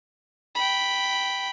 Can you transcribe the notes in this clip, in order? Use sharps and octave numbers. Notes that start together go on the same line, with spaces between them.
G5 B5